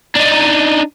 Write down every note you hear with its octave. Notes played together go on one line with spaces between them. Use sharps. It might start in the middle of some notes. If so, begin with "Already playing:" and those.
D4 D#4